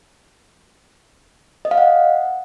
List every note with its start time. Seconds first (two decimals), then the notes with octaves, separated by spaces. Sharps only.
1.65 D#5
1.71 F5
1.78 F#5